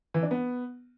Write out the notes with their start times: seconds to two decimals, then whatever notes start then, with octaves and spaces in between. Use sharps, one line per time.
0.14 E3
0.23 D4
0.31 B3